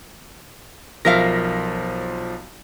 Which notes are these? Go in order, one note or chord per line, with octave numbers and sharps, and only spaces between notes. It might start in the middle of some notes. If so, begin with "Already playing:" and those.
B1 F3 A#4 E5 F5 A#6